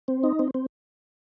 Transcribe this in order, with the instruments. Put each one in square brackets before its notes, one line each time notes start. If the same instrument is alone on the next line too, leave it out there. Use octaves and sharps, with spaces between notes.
[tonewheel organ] C4
D#4
C4
C4